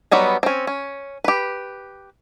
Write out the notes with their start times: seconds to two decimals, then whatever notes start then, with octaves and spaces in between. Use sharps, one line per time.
0.11 F#3 G3 B3 D#4
0.43 C4 C#4
0.67 C#4
1.24 G4 B4